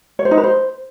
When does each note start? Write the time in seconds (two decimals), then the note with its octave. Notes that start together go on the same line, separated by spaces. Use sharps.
0.19 C#5
0.25 C5
0.31 D#4
0.37 B4
0.44 C5